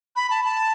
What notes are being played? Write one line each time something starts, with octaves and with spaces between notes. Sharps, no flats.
B5
A5
A5